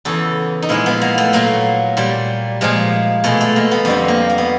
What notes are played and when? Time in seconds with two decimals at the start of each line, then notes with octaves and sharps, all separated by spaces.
0.05 E2 C#3 E3 A4
0.62 D#4
0.69 A#2 F3 G#3 E4
0.86 B3
1.02 A#3
1.18 A3
1.33 A#2 F#3 A#3
1.97 A#2 G3
2.61 A#2 F3 G#3
3.24 B2 G#3 A3
3.41 A3
3.56 A#3
3.71 B3
3.85 F2 D3 G3 C4
4.08 A#3
4.30 A#3
4.38 B3